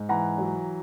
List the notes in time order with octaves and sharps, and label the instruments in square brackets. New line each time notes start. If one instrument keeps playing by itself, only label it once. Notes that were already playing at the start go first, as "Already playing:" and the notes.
Already playing: [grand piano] G#2
E3 F#5 A#5
F#3